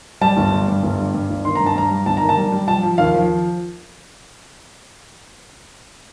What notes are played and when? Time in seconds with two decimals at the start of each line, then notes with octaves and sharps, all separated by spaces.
0.21 G3 A5
0.37 G1
0.53 G3
0.68 G2
0.83 G1
0.99 G3
1.14 G2
1.29 G1
1.45 D#3 C6
1.55 G2 A#5
1.66 A5
1.75 G2 A#5
1.91 G3
2.06 G1 A5
2.17 D#3 A#5
2.29 A5
2.37 G3
2.52 G3
2.68 F3 A5
2.83 F3
2.98 D#2 F5
3.14 F3